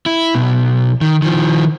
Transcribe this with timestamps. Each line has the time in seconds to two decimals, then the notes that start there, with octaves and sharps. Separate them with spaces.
0.06 E4
0.35 B1 B2
1.01 D#3
1.22 D#3 F3